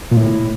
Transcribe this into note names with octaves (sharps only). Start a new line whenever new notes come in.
A#2
A2